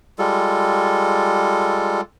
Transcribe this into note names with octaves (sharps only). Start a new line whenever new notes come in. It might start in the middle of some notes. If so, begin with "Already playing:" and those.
G3 G#3 F4 A4